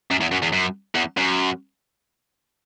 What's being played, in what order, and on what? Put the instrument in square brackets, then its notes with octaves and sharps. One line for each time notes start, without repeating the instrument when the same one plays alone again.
[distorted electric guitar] F#2
E2
F#2
E2
F#2
E2
F#2